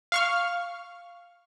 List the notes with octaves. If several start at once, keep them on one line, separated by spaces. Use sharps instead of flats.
F5 C#6 F6